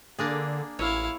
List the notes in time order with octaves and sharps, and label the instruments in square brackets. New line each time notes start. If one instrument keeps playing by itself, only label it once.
[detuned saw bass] D3 [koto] A#3 D4 G#4
[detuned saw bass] A1 [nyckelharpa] E4 F5 [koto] C#5